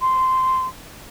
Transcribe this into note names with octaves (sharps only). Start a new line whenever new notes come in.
C6